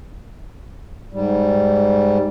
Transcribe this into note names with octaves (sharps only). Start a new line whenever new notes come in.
G#2 G3